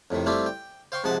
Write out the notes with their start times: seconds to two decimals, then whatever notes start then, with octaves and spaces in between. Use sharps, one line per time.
0.11 F2 A2 C3 D#3
0.26 G3 A3 C4 E4 F4 G4
0.46 G5
0.92 C5 F5 G5 C6 C#6
1.04 G#2 C3 F3 G#4 F#5 A5